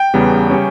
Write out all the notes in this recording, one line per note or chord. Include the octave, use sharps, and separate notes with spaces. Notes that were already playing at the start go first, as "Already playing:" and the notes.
Already playing: G5
E2 C#3 G3 B3
C#3 G3 C#4